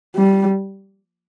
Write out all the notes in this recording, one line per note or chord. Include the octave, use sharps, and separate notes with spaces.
G3